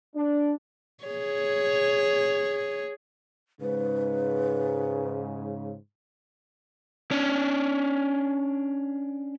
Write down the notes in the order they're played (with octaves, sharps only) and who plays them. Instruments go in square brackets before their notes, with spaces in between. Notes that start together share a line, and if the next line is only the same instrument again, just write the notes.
[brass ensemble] D4
[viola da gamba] G#4 C#5
[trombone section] G#2 C#3 [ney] B4
[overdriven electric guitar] C#4 D4